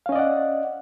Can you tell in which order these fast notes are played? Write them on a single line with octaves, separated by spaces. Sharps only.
F5 C#4 D#5 D5 F#5